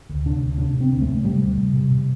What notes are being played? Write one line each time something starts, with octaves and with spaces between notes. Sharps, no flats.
D2
C3 D4
D2
C3 D4
C3
C4
D2
A3
C3
C3 G3
D2
C3
C3
C3